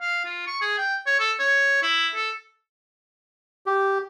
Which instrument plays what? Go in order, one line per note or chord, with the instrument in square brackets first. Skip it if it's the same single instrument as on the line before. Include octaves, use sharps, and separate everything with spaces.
[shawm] F5
F4
C#6
G#4
G5
C#5
A4
C#5
E4
A4
[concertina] G4